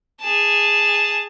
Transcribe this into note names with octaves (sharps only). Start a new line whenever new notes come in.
G#4 A5